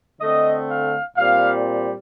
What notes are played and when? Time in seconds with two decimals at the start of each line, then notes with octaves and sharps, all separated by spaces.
0.21 D3 A3 C4 D#5
0.69 F5
1.17 A#2 G3 C4 F5